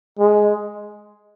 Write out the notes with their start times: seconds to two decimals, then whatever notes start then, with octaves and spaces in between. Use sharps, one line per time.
0.19 G#3